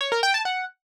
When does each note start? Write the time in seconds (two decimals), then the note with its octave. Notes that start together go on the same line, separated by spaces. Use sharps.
0.01 C#5
0.12 A#4
0.23 G5
0.34 A5
0.45 F#5